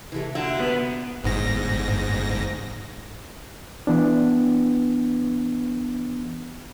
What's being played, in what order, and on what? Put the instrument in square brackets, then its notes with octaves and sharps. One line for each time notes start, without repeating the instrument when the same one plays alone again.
[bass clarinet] C3 [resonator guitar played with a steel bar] E3 G#3 A3
[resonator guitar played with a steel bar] A#2 F#4 E5 [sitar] D3
[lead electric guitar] B3
[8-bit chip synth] G1 G#2 A#6
[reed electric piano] E3 B3 D4